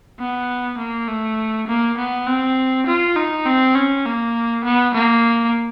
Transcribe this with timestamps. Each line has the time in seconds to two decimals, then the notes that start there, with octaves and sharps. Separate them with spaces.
0.20 B3
0.78 A#3
1.08 A3
1.68 A#3
1.98 B3
2.27 C4
2.87 F4
3.16 D#4
3.46 C4
3.76 C#4
4.06 A#3
4.65 B3
4.94 A#3